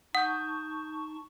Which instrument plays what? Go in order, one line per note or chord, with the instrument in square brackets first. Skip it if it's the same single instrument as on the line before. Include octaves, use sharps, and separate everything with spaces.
[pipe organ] D#4 A5 C#6 [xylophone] F#5 [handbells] D#6 G6